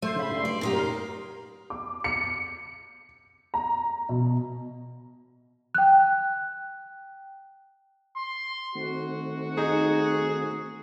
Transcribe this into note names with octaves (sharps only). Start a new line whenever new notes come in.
A3 C5
C#3 B5
G2 C6
D5
F#2 A#2 D#4 G4
A#4 C6
D6
C#7
A#5
B2
G5 F#6
C6
D#3 A3 C4 F#4
D#4 G#4